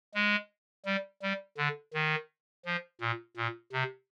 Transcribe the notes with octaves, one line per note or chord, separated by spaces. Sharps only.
G#3
G3
G3
D3
D#3
F3
A#2
A#2
C3